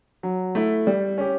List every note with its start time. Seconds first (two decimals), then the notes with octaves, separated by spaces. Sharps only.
0.23 F#3
0.55 A3 E4
0.87 G3
1.18 C#4 G4